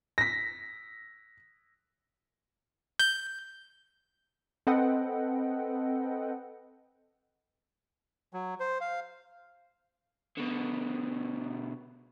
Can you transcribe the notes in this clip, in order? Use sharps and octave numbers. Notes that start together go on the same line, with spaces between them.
A#6 B6
G6
C4 A4 B4 D#5 F#5 G5
F#3
C5
F5
B2 D3